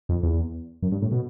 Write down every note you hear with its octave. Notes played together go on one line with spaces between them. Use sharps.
F2
E2
F#2
G2
A2
B2